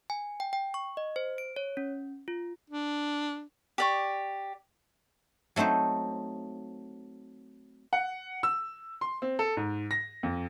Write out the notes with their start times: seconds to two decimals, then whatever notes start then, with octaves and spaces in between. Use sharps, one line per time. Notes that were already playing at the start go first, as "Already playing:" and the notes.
0.10 G#5
0.40 G5
0.53 G5
0.74 C#6
0.97 D#5
1.16 C5
1.38 D7
1.56 C#5
1.77 C#4
2.28 F4
2.70 D4
3.78 G4 D5 C#6
5.56 F#3 A3 C4 D#4 C5
7.93 F#5
8.43 E6
9.01 C6
9.22 C4
9.39 A4
9.57 G#2
9.91 A#6
10.23 F2